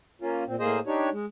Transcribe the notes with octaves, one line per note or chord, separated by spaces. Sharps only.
A#3 C#4 F4
A#2 C4
A2 A#3 G#4 C5 D#5
D4 D#4 G4 C#5
G#3